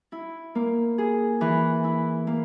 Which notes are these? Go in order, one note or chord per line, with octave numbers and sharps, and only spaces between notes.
E4
A#3
G#4
E3
E4
A#3